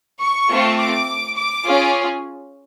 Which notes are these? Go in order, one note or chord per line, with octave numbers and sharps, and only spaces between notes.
C#6
A3 C4 F4
D6
D6
C#4 F4 G#4